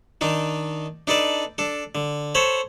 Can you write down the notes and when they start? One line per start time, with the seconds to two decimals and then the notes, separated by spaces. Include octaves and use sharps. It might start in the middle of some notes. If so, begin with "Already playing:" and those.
0.21 D#3 D4 D#4
1.07 D4 D#4 A4 B4 D5
1.58 D4 A4
1.95 D3
2.35 A4 C5 C#5 B5